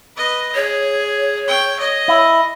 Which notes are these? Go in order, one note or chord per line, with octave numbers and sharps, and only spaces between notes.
B4 D#5
G#4 C#5
G5 C#6
D#5
E4